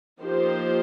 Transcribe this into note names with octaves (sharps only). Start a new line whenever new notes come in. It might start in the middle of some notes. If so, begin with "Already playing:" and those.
F3 A#3 D#4 G4 C5